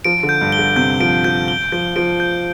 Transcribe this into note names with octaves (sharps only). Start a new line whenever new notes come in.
F3 D7
D3
G6
G2
G7
D3
C3 G6
F3 D7
F3 G6
G7
F3 G6
F3 D7
G6